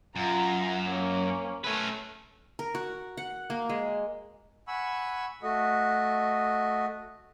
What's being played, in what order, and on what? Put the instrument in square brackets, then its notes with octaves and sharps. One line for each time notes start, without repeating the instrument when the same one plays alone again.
[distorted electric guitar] F#2 [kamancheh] F4 A#5
[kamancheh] A#3 C#4
[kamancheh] A3 [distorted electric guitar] C#4 B4
[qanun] A#4
F#4
F#5
A#3
G#3
[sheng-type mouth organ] F#5 G#5 B5 C#6 E6
A3 F#4 D#5